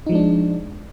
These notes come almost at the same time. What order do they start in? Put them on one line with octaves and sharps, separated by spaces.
D#4 F3 G#3 D4